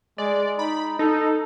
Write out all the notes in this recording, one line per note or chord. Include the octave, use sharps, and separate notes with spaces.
G#3 D5
D#4 B5
D#4 A4